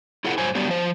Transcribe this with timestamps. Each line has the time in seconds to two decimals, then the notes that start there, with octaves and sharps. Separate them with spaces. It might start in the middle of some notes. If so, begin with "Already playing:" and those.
0.24 E4 F4 G#4 A#4 F#5
0.38 G2 F#3 C5 G#5
0.55 F#3 G3 B3 D4 G4
0.68 F3 C5